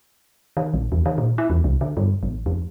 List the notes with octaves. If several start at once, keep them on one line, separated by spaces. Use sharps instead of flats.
D#3
A#1
E2
D#3
A#2
E4
E2
C2
D3
G2
A1
F2